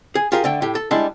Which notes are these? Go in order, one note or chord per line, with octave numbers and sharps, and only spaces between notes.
G#4
F4 G4 G#4 A#4
D3 A3 G5
A2 G4
A4
G3 G#3 D4 E4